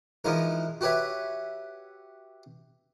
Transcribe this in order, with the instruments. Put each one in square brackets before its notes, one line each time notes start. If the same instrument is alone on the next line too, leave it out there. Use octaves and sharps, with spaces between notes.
[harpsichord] E3 F3 G#3 D#4 A#4
F#4 G4 B4 C#5 E5